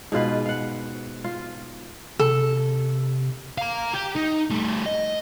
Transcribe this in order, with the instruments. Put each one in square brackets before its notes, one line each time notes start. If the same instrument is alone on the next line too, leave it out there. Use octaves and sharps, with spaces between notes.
[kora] G#2 B2 F4 B4
F5 F#5
F4
[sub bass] C3 [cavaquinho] A4
[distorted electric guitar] F5 A#5
G4
D#4
G3 A3
D#5